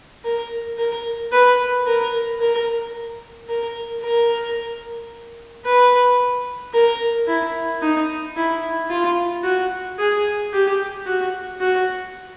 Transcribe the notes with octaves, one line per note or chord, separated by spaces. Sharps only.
A#4
A#4
B4
A#4
A#4
A#4
A#4
B4
A#4
E4
D#4
E4
F4
F#4
G#4
G4
F#4
F#4